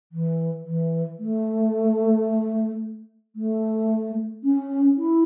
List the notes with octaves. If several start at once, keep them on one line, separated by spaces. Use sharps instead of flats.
E3
E3
A3
A3
C#4
E4